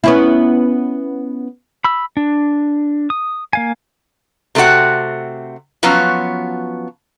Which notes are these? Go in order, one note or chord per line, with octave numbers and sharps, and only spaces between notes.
B3 C#4 E4
B5 E6
D4
D#6
A#3 F5 G#5
C3 A3 C4 F#4 F#5
F3 F#3 B3 C#4 F4 F#4